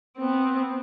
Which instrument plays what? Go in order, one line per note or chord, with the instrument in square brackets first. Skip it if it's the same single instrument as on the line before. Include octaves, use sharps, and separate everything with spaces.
[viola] B3 C4